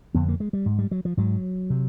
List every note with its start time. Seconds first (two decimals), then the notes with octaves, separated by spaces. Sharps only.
0.14 F2 D3 B3
0.28 A#3
0.40 G#3
0.53 G3
0.66 G#2
0.79 G3
0.91 F#3
1.05 F3
1.17 G#2 F#3
1.70 C3